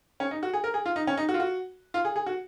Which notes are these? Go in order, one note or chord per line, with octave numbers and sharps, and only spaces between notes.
C#4
D#4
F#4
G#4
A#4
G#4
F4
D#4
C#4
D#4
F#4
F4
F#4
F4
G#4
G#4
F#4